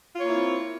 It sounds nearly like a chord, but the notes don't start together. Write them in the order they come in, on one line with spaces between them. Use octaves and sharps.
F4 C#5 A#3 E4 C4